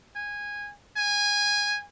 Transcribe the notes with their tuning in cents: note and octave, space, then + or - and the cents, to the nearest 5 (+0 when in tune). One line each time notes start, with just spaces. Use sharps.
G#5 -15
G#5 -15